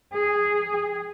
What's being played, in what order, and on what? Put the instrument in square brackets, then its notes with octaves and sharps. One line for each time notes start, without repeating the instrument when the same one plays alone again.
[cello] G#4